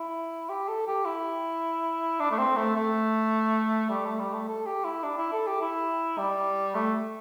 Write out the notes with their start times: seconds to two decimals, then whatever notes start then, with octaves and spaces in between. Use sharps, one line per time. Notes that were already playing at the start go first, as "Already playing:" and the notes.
Already playing: E4
0.49 G4
0.68 A4
0.87 G4
1.05 E4
2.19 D4
2.31 A3
2.39 C4
2.57 A3
2.76 A3
3.90 G3
4.05 A3
4.19 G3
4.33 A3
4.48 A4
4.66 G4
4.84 E4
5.03 D4
5.18 E4
5.33 A4
5.47 G4
5.61 E4
6.18 G3
6.74 A3